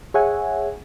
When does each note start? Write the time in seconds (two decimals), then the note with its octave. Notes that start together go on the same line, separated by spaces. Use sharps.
0.14 G#4 C#5 E5 F#5 G#5